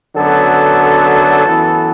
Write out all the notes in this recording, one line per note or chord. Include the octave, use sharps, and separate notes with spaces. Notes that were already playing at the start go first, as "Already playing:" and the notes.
F#2 D3 F#3 B3 A4
F#2 E3 B3